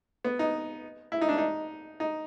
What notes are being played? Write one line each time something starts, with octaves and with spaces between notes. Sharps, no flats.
B3
D#4
E4
D#4
D4
D#4
D#4